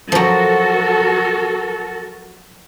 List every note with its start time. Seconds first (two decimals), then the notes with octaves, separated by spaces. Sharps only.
0.12 F3 F#3 F#4 A4 A#4